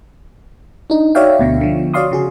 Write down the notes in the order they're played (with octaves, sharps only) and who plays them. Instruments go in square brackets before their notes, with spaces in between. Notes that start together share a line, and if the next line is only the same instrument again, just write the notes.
[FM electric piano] D4 D#4
F#4 C#5 D5 E5 F5 G5
D2 B2 D3
D3 F3
F#4 C#5 D5 F5 C6 D#6
C#3 F#4 G#4